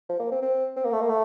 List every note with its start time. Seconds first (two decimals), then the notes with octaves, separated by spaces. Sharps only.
0.09 F3
0.20 A#3
0.32 C4
0.42 C4
0.76 C4
0.84 A#3
0.93 A3
1.01 A#3
1.09 A3